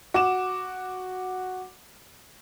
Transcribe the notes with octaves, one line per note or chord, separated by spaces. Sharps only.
F#4 D6 E7